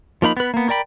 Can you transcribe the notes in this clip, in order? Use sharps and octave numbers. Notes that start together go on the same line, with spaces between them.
F3 A#3 D#4 B5
B3 B4
A#3 B3
A#4 D5 G5 B5